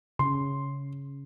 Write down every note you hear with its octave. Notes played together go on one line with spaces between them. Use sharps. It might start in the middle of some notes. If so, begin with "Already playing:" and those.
C#3 C6